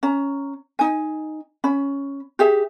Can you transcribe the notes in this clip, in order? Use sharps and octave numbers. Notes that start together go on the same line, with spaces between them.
C#4 A#5
D#4 G#5
C#4 B5
G4 G#4 E5